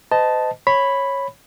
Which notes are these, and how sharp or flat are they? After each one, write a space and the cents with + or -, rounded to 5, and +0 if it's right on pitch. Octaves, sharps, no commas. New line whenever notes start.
C5 -45 D#5 +0 A5 -5
C#5 -10 B5 +0